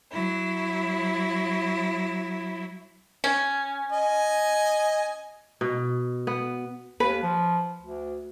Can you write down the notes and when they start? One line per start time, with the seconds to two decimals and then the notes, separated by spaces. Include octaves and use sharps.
0.12 F#3 E4
3.24 C#4
3.92 D#5 G#5
5.61 B2
6.27 B3
7.00 D#2 B4
7.23 F3
7.81 D2